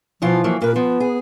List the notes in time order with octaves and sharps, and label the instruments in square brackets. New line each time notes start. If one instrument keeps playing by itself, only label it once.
[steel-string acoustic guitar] B2 E3 F4 [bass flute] F3
[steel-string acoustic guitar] E3 F#3 A#3
[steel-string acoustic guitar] A#2 B4 [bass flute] A#4
[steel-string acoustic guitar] F3 [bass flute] B3
[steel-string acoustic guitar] G#4